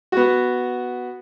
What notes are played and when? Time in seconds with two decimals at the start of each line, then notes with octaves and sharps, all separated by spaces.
0.12 B3 F#4